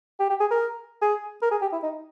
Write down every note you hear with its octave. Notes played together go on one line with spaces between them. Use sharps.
G4
G4
G#4
A#4
G#4
A#4
G#4
G4
E4
D#4